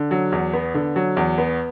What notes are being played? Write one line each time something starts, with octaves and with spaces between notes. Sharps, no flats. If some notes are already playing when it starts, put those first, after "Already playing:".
Already playing: D3
F#3
E2
B3
D3
F#3
E2
B3